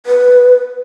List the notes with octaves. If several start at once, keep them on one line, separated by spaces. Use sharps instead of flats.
B4